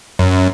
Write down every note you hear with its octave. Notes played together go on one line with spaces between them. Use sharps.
F#2